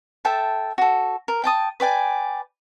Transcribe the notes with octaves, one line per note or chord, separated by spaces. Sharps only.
A4 E5 G5 A5
F#4 A4
A#4
G5 A5 D#6
B4 D5 G5 G#5